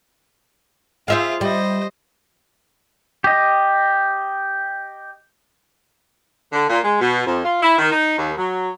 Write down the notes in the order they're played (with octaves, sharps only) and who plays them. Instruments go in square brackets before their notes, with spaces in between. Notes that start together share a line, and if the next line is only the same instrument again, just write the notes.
[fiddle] F4 G#4 [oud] C5 E5 F5
[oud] G3 [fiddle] C5 D#5
[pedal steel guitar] G4 D#5
[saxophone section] D3
A#2
G#3
B2
F2
F4
E4
D#3
D#4
D#2
F#3